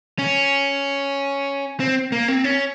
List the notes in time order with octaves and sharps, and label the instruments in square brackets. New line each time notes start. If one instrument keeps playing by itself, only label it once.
[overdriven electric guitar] C#4
C4
A#3
C4
C#4